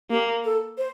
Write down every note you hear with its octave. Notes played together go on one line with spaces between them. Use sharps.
A#3 G4
A4
C5